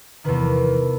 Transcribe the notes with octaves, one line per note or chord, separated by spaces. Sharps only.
E2 C3 D#3 B4